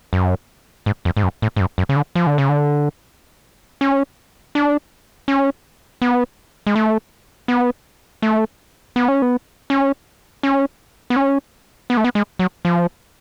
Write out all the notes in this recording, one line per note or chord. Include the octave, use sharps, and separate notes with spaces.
F#2
G#2
F2
G#2
F#2
A2
G#2
F#2
F#2
C#3
D3
F3
D3
C#3
D3
C#4
D4
C#4
B3
G#3
A3
B3
A3
B3
C#4
B3
C#4
C#4
B3
C#4
B3
A3
B3
G#3
F#3
F3